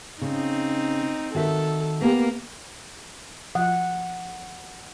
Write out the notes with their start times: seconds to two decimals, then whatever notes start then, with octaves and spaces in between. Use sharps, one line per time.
0.21 C#3 C4 D#4
1.34 D#3 F#4 A4 E5
2.01 A#3 B3 G4
3.55 F3 F4 F#5